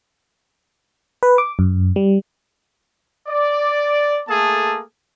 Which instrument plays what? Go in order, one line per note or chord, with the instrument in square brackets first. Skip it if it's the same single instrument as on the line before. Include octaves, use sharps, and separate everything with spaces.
[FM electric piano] B4
D6
F#2
G3
[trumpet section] D5
A3 A#3 G#4 A4 A5